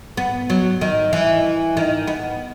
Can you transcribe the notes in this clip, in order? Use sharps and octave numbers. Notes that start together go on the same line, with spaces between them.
B3
F#3
D#3
E3
D#3
B3